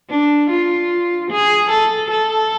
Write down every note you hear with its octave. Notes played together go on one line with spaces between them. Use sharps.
D4
F4
G#4
A4
A4